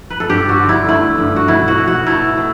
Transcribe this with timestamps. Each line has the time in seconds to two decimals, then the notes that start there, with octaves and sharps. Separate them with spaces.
0.10 B4
0.20 A4
0.29 G2 G4
0.49 F#4
0.59 D3
0.69 E4
0.89 A3 E4
1.18 G2
1.36 F#4
1.48 B2 E4
1.68 F#4
1.78 B2
1.87 F#4
2.07 A3 E4
2.37 B2